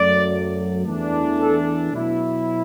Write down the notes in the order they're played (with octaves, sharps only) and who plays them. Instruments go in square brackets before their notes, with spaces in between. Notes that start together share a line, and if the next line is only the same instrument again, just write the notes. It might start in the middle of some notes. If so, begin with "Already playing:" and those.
Already playing: [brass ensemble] F#2 F#3 A3 D5
E2 E3 A3 D4
A4
B2 F#3 B3 E4